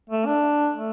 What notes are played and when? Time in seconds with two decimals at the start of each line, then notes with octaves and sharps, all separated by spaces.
0.10 A3
0.26 D4
0.76 A3